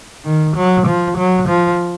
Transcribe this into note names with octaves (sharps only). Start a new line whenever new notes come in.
D#3
F#3
F3
F#3
F3